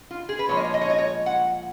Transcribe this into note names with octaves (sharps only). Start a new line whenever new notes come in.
F4
G#4
B4
A#2 F3 G#3 C#5
D#5
C#5
D#5
C#5
D#5
C#5
F#5